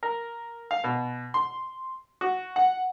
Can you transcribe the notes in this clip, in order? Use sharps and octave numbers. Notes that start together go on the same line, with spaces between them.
A#4
F5
B2
C6
F#4
F#5